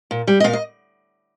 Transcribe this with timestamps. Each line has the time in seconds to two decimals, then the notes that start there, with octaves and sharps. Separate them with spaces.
0.11 A#2
0.27 G3
0.40 D#5
0.44 A#2 F5
0.53 D#5